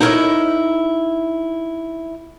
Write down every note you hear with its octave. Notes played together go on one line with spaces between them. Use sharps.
D#4 E4 A#4 B4 C#5 D#5